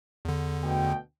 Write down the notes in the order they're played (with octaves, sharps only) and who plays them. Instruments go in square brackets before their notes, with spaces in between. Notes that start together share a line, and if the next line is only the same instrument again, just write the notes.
[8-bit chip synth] E2 D3
[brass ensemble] D2 B2 G5